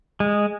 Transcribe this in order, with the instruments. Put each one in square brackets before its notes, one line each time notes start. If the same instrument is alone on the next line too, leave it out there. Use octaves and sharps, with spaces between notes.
[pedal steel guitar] G#3